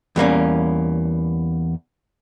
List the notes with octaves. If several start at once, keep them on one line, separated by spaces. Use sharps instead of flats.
E2 G3 A#3 C#4